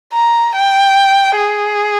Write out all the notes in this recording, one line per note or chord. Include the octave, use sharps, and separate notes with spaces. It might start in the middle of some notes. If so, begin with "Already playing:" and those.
A#5
G5
G#4